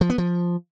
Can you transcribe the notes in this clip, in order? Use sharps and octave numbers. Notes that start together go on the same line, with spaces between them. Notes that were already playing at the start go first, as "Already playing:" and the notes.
F3
B3
F3